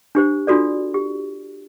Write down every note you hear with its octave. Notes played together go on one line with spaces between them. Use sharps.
D4 G4 C5
D4 F4 F#4 A4 D5
G4